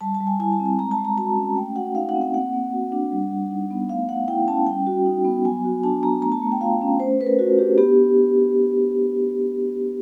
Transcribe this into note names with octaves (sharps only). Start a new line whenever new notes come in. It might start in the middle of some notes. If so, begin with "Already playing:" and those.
G3 A5
A5
G3
G#5
E4 G#5
A5
C4
A5
G#3 A#5
A5
G#3
A#5
F#4 A5
C#4
A3 G5
F#4 F#5
D#4 F5
F#5
C4
F#5
A#3 F#5
A#3
F#4
D4
G3
G3
D#4
B3
A3 F5
A3 F#5
E4 G5
C#4 A5
G3 G5
F#4
D#4
B3
F#3 G#5
F#4
D4 A5
B3 A#5
A3 A#5
A5
A3
G5
F4 F5
C#4
A3 C5
A3 B4
A#4
F4 F#4
D4 G4
B3 G4